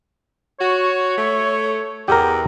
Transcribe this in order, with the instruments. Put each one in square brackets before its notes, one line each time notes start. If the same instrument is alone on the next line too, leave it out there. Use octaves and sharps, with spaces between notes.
[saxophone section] F#4 [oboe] C#5
[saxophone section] A3
[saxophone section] E2 [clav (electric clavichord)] G4 A#4